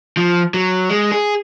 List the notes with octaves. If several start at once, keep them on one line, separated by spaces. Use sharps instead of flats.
F3
F#3
G#3
G#4